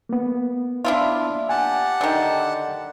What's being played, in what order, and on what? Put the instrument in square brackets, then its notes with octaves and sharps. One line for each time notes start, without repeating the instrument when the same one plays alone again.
[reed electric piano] A#3 B3
[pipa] D4 E4 F4
[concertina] G4 F#5 A5 [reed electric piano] G#5
[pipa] D3 D#3